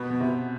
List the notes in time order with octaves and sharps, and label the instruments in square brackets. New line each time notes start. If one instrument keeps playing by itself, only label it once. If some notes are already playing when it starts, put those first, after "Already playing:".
Already playing: [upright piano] B2 [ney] B3
[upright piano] B2
C3